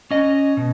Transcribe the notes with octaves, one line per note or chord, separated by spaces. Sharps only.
C#4 D#5
B2